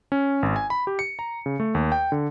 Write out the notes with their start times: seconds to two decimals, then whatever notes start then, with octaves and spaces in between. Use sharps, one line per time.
0.12 C#4
0.43 G#1
0.56 G#5
0.70 B5
0.87 G4
0.99 C#7
1.19 A#5
1.46 C#3
1.60 A3
1.75 D#2
1.92 G5
2.12 D3